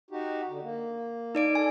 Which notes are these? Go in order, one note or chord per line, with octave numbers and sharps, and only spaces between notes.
D#4 F#4 G4
D3
A#3
D#4 D5 D7
A4 G#5